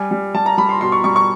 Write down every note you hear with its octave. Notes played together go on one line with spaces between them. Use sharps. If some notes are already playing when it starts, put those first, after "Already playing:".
Already playing: G3 G#5
G3
G3 A5
A#5
G3 B5
C6
B2 C6
C#6
G3 C#6
C#6